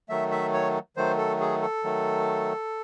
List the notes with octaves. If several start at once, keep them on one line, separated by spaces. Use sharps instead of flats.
D#3 F#3 A3 E5
E5
C#5
D#3 F#3 A3 C5
A4
G#4
A4
D#3 F#3 A3